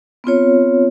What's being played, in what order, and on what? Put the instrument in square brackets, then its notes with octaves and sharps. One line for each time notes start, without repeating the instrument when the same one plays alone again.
[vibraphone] B3 C4 F4 C#5